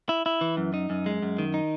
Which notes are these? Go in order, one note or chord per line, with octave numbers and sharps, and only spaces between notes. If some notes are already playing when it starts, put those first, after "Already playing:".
E4
E4
E3
F#2
D#4
F#2
G#3
F#2
D#3
D#4